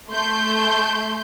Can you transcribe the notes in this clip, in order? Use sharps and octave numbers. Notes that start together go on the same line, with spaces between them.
A3 C6 G6